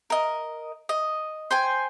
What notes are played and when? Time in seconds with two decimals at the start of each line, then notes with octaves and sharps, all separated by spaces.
0.10 A#4 D#5
0.89 D#5
1.51 C5 G5 G#5